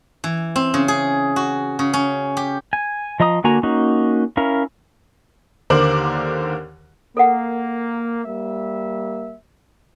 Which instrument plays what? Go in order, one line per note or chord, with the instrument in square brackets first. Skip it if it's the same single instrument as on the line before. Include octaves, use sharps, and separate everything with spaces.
[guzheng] E3
C4
C#3
G#4
F#4
C#3
C#4
G4
[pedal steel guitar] G#5
F3 D#5 A#5 D#6
D3 A#3 F#4 G#5 A#5
A#3 C#4 D#4 F#4
C#4 E4 A#4 F5
[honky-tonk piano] D#2 D3 A#4 C5 D6 F#7
[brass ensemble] A#3 [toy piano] A4 A#4 F#5
[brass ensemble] G3 A#3 E5